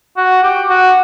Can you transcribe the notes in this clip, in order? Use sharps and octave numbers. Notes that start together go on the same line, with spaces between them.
F#4
G4
F#4